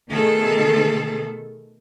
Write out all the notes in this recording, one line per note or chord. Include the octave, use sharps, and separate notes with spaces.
B2 D#3 A3 G#4 A4